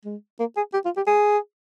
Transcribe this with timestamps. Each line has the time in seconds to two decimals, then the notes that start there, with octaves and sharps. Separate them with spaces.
0.05 G#3
0.40 A#3
0.57 G#4
0.74 G4
0.85 F4
0.97 G4
1.07 G#4